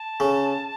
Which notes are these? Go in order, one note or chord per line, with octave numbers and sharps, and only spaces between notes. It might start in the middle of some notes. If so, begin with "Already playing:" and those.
Already playing: A5
C#3